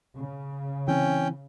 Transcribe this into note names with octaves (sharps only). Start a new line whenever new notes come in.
C#3
E3 C4 C#4 G5